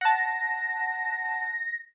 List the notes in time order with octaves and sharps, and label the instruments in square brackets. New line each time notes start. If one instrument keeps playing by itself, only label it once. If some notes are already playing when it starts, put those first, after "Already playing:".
[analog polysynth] F#5 A5 [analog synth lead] A#6